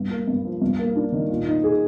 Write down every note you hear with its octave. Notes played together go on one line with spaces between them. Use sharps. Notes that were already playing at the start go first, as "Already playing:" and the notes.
Already playing: G2
A#3
G2
F3
G2
A#3
D4
D#3
A#2
D#4
G#4